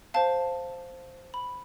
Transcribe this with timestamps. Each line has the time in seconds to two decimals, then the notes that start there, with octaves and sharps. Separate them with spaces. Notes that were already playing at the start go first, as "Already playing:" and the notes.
0.14 C5 F5 A5
1.34 B5